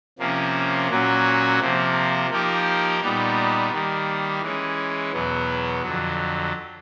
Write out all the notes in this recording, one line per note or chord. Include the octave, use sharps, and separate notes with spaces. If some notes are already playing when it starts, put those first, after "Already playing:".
C3 F3 A#3 C#4
A#2 F#3 A#3 C#4 F#4
C3 F3 A#3
F3 A#3 D#4 G4 A#4
A#2 G3 B3 D#4
D#3 G3 A#3
E3 G#3 C#4
E2 B2 F#3 B3
F2 D3 F#3